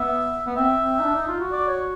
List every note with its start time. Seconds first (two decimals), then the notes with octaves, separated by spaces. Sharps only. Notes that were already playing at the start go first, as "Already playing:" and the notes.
Already playing: B3 E5
0.47 B3
0.57 C4 E5
0.80 C4
0.99 D#4
1.04 D4
1.16 D#4
1.28 F4
1.40 F#4
1.52 D5
1.68 C#5